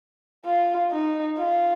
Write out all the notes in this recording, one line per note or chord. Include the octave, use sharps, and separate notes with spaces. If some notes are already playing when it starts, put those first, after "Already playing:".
F4
D#4
F4